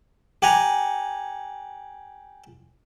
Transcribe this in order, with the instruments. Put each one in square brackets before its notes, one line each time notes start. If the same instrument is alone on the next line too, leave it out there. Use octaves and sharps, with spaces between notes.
[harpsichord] G4 F#5 G#5 A#5